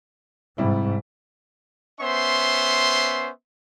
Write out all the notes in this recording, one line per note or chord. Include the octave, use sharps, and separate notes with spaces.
G#2 C3 G3 E4
B3 C#4 C5 E5 C6